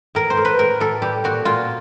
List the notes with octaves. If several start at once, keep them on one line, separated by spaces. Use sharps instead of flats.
A2 A#4
C5
A2
B4
A2 A#4
A2 A4
G3 G4
A#2 F#4
A#2 F4